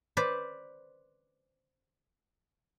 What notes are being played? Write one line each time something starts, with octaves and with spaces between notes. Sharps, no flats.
B4 C5 D5